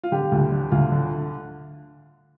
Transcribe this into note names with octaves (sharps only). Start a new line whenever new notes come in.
F4
D3 G4
D2
D3
D2 F4
D3